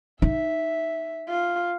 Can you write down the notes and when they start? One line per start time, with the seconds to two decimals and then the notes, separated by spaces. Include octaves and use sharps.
0.22 D#4 E5
1.29 F4